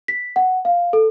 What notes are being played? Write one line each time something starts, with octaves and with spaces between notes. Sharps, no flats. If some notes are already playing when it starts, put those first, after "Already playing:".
B6
F#5
F5
A4